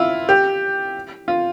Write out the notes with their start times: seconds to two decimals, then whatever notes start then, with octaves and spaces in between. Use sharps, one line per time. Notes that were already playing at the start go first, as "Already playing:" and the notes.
Already playing: E4 F4
0.29 G4
1.28 F4